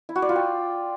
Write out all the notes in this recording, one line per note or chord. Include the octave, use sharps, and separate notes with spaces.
E4
F#4
D5
F4
G5